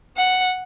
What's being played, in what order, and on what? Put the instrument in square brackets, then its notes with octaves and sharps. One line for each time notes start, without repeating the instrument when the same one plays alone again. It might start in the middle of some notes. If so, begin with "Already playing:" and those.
[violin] F#5